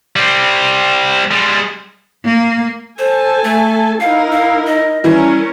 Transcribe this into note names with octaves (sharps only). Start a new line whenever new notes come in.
G3 C4
G3 G#3
A#3
A4 C5 G#5 A5
A3
D#4 E4 A#4 F5
F5
D#5
E3 G3 C#4 E4 A#4